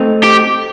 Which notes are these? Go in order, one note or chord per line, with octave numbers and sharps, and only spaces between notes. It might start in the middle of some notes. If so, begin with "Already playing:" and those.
Already playing: A3 C4 D#4
G4